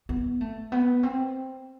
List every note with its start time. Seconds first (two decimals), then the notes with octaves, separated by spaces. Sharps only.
0.09 B3
0.41 A3
0.72 B3
1.03 C4